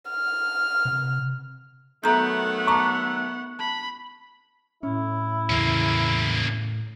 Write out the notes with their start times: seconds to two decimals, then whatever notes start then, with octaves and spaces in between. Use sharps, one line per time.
0.10 F6
0.85 C3
2.04 D#3 F#3 A3 B3 E5 F#5 A#5 G6
2.67 A5 A#5 C#6 D6
3.59 A5 B5
4.83 A2 C#4 E4
5.50 E2 C#3 E3 A#3 C#4